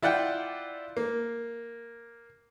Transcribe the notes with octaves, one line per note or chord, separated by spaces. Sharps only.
E4 F4 D5 F#5 G5
A#3